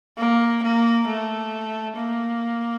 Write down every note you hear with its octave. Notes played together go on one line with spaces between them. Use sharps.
A#3
A#3
A3
A#3